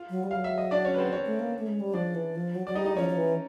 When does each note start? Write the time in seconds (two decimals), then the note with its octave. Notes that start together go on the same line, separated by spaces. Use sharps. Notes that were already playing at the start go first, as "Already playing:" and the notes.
Already playing: F4 F5
0.10 F#3
0.23 G3
0.31 F#3 F5
0.44 E5
0.58 D#5
0.71 D4 D5
0.85 C#4 C#5
0.94 B4
0.98 C4 C5
1.12 C#4 C#5
1.26 A3
1.40 A#3
1.58 A3
1.67 G#3
1.80 G3
1.94 F3 D4 D5
2.15 E3
2.35 F3
2.55 F#3
2.67 F#3 D5
2.75 G3 D#4 D#5
2.86 D#4 D#5
2.96 F3 C#4 C#5
3.09 F3
3.17 E3